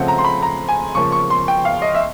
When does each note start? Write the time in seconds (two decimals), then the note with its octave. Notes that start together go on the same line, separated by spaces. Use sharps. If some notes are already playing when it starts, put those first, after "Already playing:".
Already playing: C#3 F3 A3 C4 F#5
0.08 A#5
0.18 C6
0.24 B5
0.42 A#5
0.69 G#5
0.95 C#3 F3 A#3 C#6
1.12 C#6
1.30 C6
1.48 G5
1.65 F5
1.82 D#5
1.95 E5